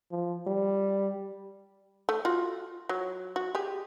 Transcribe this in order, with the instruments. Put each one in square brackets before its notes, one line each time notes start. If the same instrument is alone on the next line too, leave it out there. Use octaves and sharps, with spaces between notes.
[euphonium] F3
G3
[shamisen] A3
F4 F#4
F#3
F#4
G4 G#4